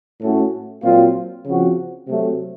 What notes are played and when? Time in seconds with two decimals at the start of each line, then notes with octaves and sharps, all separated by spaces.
0.21 A2 A3 C#4 F#4 A4
0.83 A#2 F#3 C4 F4
1.46 C#3 F3 C4 F#4
2.08 C3 F#3 A3